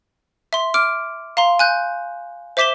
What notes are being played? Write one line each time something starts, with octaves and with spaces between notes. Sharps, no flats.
E5 C6
D6 F6 D7
F5 A#5 C6
G#5 F#6 G6
C5 E5 D6 B6 E7 G7